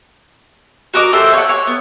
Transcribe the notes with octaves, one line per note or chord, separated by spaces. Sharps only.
F#4 A#4 D#5 D6
G4 A4 C5 E5
C#5 F#5
C#5
B3